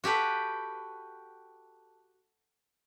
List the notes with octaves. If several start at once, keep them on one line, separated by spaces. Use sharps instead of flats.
F#4 G4 A4 B4